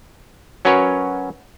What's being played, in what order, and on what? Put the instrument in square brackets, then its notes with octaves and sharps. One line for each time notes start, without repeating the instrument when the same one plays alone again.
[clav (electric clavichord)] F#3 C#4 F#4 A#4 B4 C#5